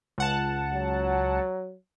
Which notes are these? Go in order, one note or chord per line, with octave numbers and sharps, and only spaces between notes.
C#2 F#5 A5
F#3